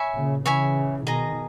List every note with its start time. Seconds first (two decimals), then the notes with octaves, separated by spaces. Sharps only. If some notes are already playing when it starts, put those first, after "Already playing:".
Already playing: C#5 E5 G#5 B5
0.15 A#2 C#3
0.46 C#3 E3 C#5 E5 G#5 B5
1.07 B2 D#3 G#4 D#5 A#5